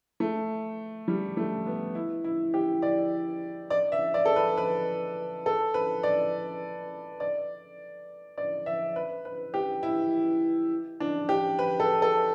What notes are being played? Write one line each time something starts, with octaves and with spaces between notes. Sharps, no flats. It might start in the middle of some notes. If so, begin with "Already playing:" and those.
A3
G3
A3
B3
E4
E4
G4
D5
D5
E5
D5
A4
B4
B4
A4
B4
D5
D5
D5
E5
B4
B4
G4
E4
D4
G4
B4
A4
A4